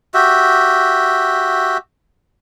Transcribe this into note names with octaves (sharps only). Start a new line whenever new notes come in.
F#4 G4 E5